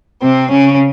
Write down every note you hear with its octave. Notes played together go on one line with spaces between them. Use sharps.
C3 C4
C#3 C#4